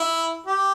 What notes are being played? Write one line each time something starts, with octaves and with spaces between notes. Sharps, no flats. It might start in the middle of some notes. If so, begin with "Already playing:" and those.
Already playing: E4
G4